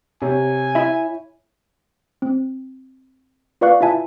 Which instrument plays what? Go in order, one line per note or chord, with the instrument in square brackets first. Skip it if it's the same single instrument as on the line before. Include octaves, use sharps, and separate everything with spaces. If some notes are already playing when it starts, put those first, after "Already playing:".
[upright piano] C3 [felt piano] G4 C#5 [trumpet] G#5
[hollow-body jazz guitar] E4 E5
[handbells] C4
F4 B4 D5 F5 C#6 F#6
E4 F4 E5 G#5 A5